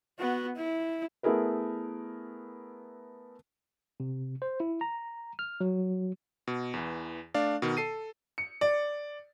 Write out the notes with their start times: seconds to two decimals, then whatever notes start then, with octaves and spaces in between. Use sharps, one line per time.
0.18 B3 F#4
0.56 E4
1.23 A3 B3 E4 G#4 A#4 B4
4.00 C3
4.42 C5
4.60 E4
4.81 A#5
5.39 F6
5.61 F#3
6.47 B2
6.74 E2 E3
7.34 A3 D4 D5 F5
7.62 B2 D#3
7.77 A4 C7 D#7
8.38 C#7
8.61 D5